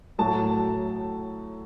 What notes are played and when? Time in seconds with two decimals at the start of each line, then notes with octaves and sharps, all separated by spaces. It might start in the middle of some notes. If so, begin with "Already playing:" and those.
0.18 A2 F#3 A3 A5